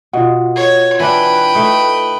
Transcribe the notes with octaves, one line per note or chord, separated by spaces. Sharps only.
B2 F4 D#5 F#5
C#5
E3 D4 B4 G5
A3 D#4